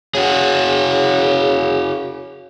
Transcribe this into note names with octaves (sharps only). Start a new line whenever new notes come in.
C#3 F#4 G#4